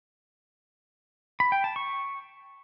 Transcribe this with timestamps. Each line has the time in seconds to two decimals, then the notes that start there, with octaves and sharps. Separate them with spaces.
1.40 B5
1.52 G5
1.64 A5
1.76 C#6